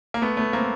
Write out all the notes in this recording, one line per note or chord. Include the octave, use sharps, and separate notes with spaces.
A#3
A3 B3
A3 B3
A#3 C4